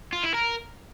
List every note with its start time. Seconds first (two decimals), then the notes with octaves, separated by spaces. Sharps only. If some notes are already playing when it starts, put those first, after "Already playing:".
0.13 F4
0.23 E4
0.34 A#4